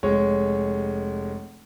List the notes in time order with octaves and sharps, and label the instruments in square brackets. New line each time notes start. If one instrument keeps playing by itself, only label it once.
[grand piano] F1 G#3 C#5